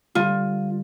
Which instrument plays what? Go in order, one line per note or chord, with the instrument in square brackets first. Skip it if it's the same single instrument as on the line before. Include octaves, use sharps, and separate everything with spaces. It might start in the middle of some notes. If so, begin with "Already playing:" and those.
[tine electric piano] D3 G3 [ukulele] F4